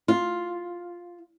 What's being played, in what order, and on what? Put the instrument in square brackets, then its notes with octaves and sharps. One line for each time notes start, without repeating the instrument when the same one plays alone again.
[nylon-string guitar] F4